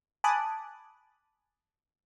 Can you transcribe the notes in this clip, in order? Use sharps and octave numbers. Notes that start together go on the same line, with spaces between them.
G#5 A5 B5 D6 D#6 F#6